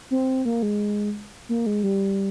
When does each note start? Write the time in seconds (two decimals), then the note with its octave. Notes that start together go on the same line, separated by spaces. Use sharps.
0.11 C4
0.45 A#3
0.63 G#3
1.49 A#3
1.66 G#3
1.83 G3